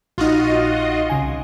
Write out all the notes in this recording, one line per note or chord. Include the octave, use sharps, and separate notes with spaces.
A#1 D#4 F4 F#4 D#5
C2 C#3 G#5